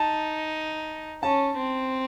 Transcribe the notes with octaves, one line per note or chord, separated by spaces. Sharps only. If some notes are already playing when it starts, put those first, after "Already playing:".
Already playing: D#4 A5
C#4 A5
C4